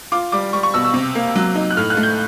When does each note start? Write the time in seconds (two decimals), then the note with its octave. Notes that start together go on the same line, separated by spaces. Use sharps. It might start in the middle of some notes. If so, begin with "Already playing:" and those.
0.12 F4 D6
0.32 G3 D6
0.53 G3 C#6
0.63 C#6
0.74 B2 E6
0.85 E6
0.94 C3
1.15 A#3
1.36 F#3
1.55 D#4
1.70 F#6
1.77 A2 F6
1.90 F#6
1.97 A3
2.03 G6